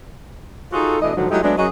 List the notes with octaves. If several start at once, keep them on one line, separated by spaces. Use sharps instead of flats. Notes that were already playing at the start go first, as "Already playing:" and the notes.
D#4 F4 F#4 G#4 A4
B2 E3 A3 D4 D#5
G#2 D3 D#3 F3 F#3
F#3 G#3 A3 D#4 E4 G4
F#3 G#3 A3 B3 D4
F#2 F#3 F#4 G#4 D#5